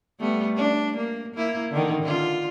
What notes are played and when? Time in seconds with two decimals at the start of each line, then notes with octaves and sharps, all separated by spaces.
0.20 G3 A3 B3
0.57 D4
0.97 A#3
1.35 A#3 E4
1.71 D3 D#3
2.03 D3 F4